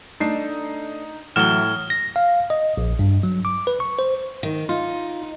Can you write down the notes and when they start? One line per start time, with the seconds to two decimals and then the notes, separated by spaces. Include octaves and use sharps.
0.20 A3 D4 D#4 C7
1.36 A2 E3 F#3 F#5 F6 E7 G7
1.90 A#6
2.16 F5
2.50 D#5
2.77 A#1
2.99 G2
3.23 F#3
3.45 D6
3.67 B4
3.80 C#6
3.99 C5
4.43 D#3
4.69 D#4 F4